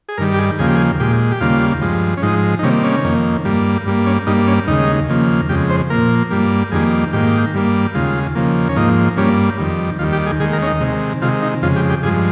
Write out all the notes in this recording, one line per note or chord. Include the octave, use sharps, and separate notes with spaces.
G#4
G2 D#3 G3 A#4
G4
G#4
D#2 C#3 F3 A#3 G#4
G4
G#4
A#2 G#3 G4
G4
D#2 C#3 G3 A#3 F4
G2 F3 G#3
C#4
G#2 F3 G#3 D#4
D#4
C3 D#3 G3 A#3 C#4
C#4
F2 D#3 A#3
G2 G3 A#3
G2 G3 A#3
C#4
G2 G3 A#3 D#4
C#4
D#2 C#3 G#3 D#4
D#2 C#3 F3 A#3
F2 C#3 G#3 G4
C5
A#2 F3 A#3 A#4
G2 G3 A#3
F2 D#3 G3 A#3 G#4
G#2 D#3 A#3 G4
G2 G3 A#3
D#2 C#3 G#3 F4
D#2 C#3 F3 A#3
C#4
G#2 F3 A#3 D#4
G2 G3 A#3 C#4
F2 D#3 G3
D#2 D#3 G3 F4
G4
G#4
D#2 D#3 G#3 G#4
A#4
C#4
D#4
C3 D#3 G#3
C3 D#3 G#3 F4
D#4
F2 C#3 G#3 F4
G4
G4
G2 F3 G#3 G#4